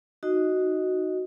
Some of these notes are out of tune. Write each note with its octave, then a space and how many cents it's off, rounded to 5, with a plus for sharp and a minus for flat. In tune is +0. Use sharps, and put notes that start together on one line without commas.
D#4 +0 F#4 +0 D#5 +5